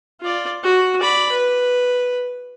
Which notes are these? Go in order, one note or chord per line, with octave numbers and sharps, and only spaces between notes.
F4 D5
F#4
D5 B5
B4